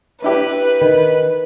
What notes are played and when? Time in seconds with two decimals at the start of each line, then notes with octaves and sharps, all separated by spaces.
0.22 D4 E4 G4 B4
0.81 D#3